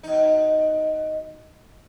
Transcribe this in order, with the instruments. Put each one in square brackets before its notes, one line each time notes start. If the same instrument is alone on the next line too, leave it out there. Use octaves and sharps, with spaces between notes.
[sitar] B2 D#4